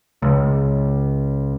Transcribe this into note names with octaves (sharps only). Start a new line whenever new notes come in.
C#2